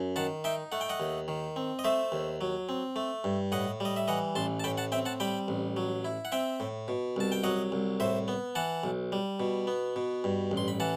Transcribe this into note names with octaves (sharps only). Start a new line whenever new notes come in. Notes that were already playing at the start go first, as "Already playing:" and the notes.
Already playing: F#2
D#3 F#5 A5
D#4 E5 G5
A3 F#5
G5
D#5 F#5
D#2
D#3
C4
D#5
A3 C5 E5
D#2
F#3
C4
A3
G2
A2 D#5 F#5
G3 D#5
E5
E3 D#5 F#5
A1 A5 C6
A5
A2 G5 B5
F#5 A5
C4 E5 G5
F#5 A5
G3 G5 B5
A1
F#3
E4
F#5
C4 E5 G5
A2
B2
C2 A5
G5
F#3 D#5 F#5
C2
A2 C5 E5
B3
E3 F#5 A5
B1
G3
B2
B3
B2
G2
A1
C6
B5
E3 F#5 A5